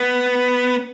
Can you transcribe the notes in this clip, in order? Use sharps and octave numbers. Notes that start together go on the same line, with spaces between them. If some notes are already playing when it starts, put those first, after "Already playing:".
Already playing: B3